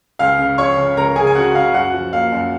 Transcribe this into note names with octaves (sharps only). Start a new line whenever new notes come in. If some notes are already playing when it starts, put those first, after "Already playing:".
C#2 F5 F6
C#3
F3 C#5 C#6
C#3
C#2 A#4 A#5
C#3 G#4 G#5
G#5
C#3 F#4 F#5
C#3 F5
F#2 F#4 F#5
F3
A#3 F5
F#2